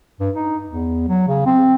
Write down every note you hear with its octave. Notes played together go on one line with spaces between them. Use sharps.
G2
D#4
E2
F#3
C#3
C4